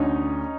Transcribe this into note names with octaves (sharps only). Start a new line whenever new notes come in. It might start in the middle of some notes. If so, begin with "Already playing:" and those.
Already playing: D2 C#4 D#4